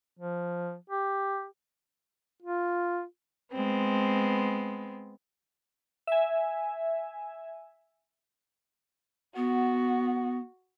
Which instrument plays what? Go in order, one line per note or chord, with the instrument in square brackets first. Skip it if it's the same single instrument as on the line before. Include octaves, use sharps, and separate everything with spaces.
[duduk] F3
G4
F4
[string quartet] G#3 B3 C4
[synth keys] E5 G#5
[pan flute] B3 [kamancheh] F#4